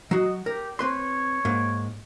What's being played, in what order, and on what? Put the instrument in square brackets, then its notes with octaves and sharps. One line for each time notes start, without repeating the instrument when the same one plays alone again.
[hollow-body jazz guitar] F#3 F#4 [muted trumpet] D#5
[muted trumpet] G4 [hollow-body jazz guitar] A#4
[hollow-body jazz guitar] C4 B4 C6 [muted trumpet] C#5
[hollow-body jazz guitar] G#2 A#3